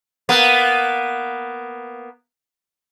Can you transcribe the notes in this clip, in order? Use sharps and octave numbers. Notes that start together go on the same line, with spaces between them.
A#3 B3